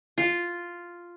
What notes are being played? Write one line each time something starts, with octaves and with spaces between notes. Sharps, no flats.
F4